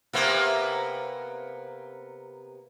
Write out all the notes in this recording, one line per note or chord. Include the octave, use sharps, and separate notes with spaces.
C3 A#3 B3